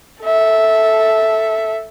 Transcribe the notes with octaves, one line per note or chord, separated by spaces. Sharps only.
A4 E5